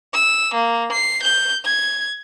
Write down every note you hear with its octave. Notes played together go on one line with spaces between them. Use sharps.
E6
A#3
C7
G6
G#6